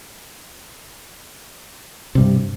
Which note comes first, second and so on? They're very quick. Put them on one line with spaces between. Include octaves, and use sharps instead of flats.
C3 G3 G2